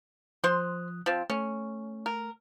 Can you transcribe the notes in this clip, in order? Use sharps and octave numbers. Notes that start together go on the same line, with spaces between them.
F3 C5 C6 D#6 F#6
F3 C4
A3 C#4
A#4